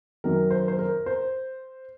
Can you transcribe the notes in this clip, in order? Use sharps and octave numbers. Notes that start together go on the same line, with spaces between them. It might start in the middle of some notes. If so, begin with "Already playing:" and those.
F#2 D#3 F#3 A#4
C5
C5
A#4
C5